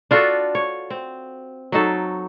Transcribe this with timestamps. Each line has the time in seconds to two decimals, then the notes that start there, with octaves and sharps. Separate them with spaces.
0.11 D4 F4 F#4 A4
0.55 C#5
0.90 C4
1.72 F#3 D#4 A4